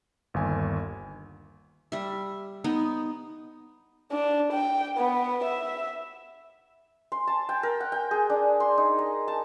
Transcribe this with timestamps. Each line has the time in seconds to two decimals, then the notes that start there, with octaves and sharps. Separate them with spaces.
0.34 G1 D#2 G#5
1.92 G3 E5
2.64 B3 D#4
4.11 D4
4.52 G5
4.97 B3
5.44 E5
7.12 C6
7.27 A5
7.49 G5
7.63 A#4
7.80 F#5
7.92 G5
8.11 G#4
8.30 D4
8.60 C6
8.78 D#4
8.98 A#5
9.28 A5